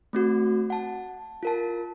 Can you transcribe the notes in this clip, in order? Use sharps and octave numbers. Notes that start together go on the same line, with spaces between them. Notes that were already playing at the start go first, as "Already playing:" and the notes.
A3 C4 F#4
F#5 A5
F4 A#4 A5